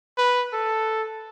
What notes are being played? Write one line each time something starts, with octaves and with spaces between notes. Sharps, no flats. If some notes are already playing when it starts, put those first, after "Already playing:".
B4
A4